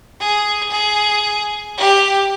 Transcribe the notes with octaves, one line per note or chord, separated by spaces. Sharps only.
G#4
G#4
G4